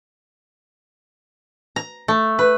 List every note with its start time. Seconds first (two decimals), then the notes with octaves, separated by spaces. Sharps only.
1.76 A#5
2.08 A3
2.39 B4